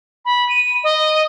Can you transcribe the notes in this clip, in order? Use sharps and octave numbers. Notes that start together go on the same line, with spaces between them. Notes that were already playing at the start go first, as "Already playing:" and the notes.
B5
D#7
D#5